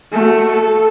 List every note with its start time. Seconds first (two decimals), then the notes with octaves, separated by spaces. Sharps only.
0.12 A3 F#4
0.52 A4